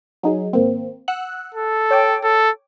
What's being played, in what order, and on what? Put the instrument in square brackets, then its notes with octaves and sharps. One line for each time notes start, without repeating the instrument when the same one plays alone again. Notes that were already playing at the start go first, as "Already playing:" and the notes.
[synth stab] F#3 D#4 G#4
G#1 A#3 C4
F#5 E6 F#6
[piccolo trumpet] A4
[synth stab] C#5 G5 D6
[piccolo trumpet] A4